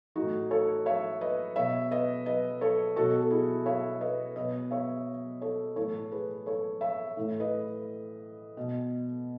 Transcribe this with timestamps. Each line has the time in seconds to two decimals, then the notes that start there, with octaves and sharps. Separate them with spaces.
0.15 A2 E3 D#4 F#4
0.51 A4 C#5
0.86 C#5 E5
1.21 B4 D#5
1.56 B2 C#5 E5
1.91 B4 D#5
2.26 B4 D#5
2.61 A4 C#5
2.96 B2 F#4 A4
3.21 A4
3.31 E4 G#4
3.66 C#5 E5
4.01 B4 D#5
4.36 B2 B4 D#5
4.71 C#5 E5
5.42 A4 C#5
5.76 A2 E3 A4 C#5
6.11 G#4 B4
6.46 A4 C#5
6.81 C#5 E5
7.17 A2 E3
7.40 B4 D#5
8.57 B2